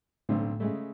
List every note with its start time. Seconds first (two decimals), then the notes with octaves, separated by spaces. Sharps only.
0.29 B1 A2 D3 C4
0.60 C#3 G#3 A3